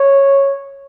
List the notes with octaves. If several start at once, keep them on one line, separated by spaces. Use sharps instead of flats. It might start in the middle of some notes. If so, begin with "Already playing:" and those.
Already playing: C#5